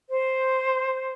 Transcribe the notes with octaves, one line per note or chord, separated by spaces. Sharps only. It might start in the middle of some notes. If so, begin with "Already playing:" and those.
C5